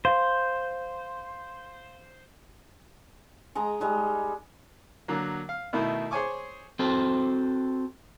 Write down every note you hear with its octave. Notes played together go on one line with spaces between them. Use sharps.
C5 F5 G6
G#3 D#5 A#5
G3 G#3 D#4
D3 F#3 A#3
F5
B2 D#3 A3 E4
G#4 C5 C#5 G#5 C#6 D6
C4 F#4 A4 C5